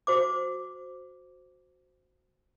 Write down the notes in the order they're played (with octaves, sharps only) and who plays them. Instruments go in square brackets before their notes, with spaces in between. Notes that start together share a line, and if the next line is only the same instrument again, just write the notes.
[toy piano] F#4 C5 D6